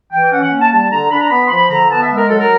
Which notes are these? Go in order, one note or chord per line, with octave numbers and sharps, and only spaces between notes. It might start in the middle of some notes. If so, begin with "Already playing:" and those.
E3 G5
C#4 F#5
F#5
A#3
A5
G3 A5
D3 A#5
D4 B5
A#5
B3 B5
C6
F3 B5
D3 A#5
B3 A5
E5
G#3
A#4
F#3 A4
A#4